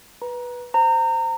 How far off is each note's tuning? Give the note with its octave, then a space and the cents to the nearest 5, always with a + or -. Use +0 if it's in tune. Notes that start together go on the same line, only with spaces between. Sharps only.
B4 -10 A#5 +25
C5 -10 A#5 -30